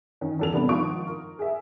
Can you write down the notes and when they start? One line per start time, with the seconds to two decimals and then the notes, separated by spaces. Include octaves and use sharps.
0.21 D#3 C#4
0.39 E2 C#4 A4 A#4 F7
0.53 G2 C3 B3 D4
0.69 G#1 F3 F4 C#6 D#6 D7
1.07 A#4
1.39 G#4 E5